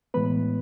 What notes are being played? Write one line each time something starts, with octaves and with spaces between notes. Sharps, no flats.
A2 E3 G#3 B3 B4 B5